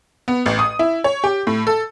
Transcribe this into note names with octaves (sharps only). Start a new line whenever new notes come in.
B3
A1
D#6
E4
C#5
G4
A2
A4